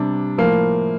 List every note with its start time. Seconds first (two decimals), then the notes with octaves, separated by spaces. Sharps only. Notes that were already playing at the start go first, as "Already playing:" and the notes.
Already playing: C3 G3 D4
0.38 A2 F3 A#3